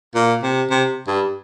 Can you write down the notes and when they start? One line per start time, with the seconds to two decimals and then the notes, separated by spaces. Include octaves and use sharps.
0.15 A#2
0.43 C3
0.70 C3
1.07 G2